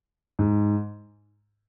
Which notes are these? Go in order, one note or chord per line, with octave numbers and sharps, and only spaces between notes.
G#2